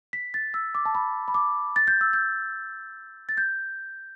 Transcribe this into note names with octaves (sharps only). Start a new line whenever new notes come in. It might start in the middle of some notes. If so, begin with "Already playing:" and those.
B6
A6
E6
D6
A5
B5
B5
D6
A6
G6
E6
G6
A6
G6